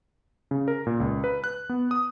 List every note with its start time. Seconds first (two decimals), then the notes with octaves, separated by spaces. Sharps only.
0.51 C#3
0.68 A#4
0.87 A#2
1.00 C#2
1.24 B4
1.44 F#6
1.69 B3
1.91 D#6